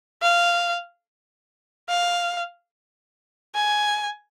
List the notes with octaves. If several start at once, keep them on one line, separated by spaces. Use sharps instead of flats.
F5
F5
G#5